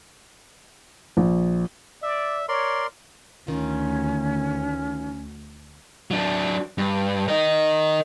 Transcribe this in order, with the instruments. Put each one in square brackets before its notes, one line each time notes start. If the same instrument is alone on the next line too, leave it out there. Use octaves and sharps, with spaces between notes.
[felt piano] A#1
[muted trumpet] D5 [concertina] E5
[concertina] A#4 D5 C6 [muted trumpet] C#5
[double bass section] D2 [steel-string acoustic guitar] D#3 F4 [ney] C#4
[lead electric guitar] F#3 D4
G2
A#4 D#5